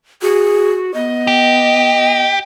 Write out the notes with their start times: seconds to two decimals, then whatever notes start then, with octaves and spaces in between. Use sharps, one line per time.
0.22 F#4 G#4
0.94 B3 D#5
1.27 G4